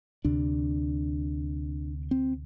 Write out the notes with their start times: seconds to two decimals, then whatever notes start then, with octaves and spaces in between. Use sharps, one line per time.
0.25 D2 C3 D4
2.11 C4